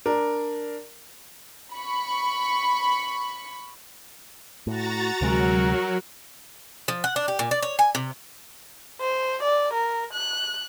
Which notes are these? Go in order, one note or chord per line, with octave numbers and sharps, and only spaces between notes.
D4 A#4
B5 C#6
A2 F#4 A#5 A6
D2 C3 F#3 G#3 F#4 A#4
F3
F#5
D4
G4
A#2
D5
C#5
G#5
C3
C5
D5
A#4
F#6